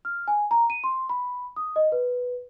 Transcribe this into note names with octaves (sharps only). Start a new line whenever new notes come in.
F6
G#5
A#5
D#7
C6
B5
D#6
D#5
B4